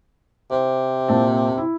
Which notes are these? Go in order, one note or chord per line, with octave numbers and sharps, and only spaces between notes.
C3 C5
A#2 C4 A5
E4